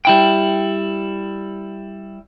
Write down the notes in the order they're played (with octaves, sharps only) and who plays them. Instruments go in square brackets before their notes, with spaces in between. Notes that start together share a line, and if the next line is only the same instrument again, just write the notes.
[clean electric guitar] G3 E4 G5